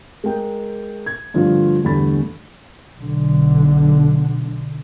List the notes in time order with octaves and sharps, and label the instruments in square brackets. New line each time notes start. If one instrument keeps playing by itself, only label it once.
[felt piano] G#3 A#4 G5
G#6
G2 D3 F3 G3 A3 F4
E2 G2 D3 A3 B5 A6
[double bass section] B1 D3